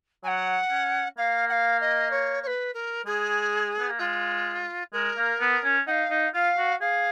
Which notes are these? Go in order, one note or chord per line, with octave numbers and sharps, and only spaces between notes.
F#3 F#5 G#5
C#4
A#3 F5
F#5
F5
D#5
C#5
C#5
B4
A#4
G#3 G#4
B3
A#3
G#3 F4
G#3 A#4
A#3
B3
C#4
D#4 F5 F#5
D#4
F4 F5
F#4
G#4 F5